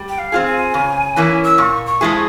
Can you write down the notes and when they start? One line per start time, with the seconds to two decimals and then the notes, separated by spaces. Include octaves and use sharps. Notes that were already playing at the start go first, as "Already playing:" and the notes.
Already playing: G3
0.09 G5
0.18 F5
0.32 C4 F4 G#4
0.46 G#5
0.74 C#3
1.16 E3 A#3 C#4 E4
1.44 E6
1.58 A#2 C#6
1.86 C#6
2.01 F3 G#3 E4 G#4